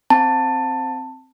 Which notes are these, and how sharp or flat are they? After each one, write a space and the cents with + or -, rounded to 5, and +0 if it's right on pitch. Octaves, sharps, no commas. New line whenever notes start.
C4 +0 A5 +15